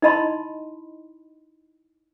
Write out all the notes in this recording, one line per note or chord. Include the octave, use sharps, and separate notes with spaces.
D#4 E4 D#5 A5 B5 C6